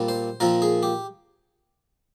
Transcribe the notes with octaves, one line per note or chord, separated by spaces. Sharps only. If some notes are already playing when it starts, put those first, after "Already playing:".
Already playing: A#2 G3 C4
C5
A#2 F3 C4 A#4
G#4
G4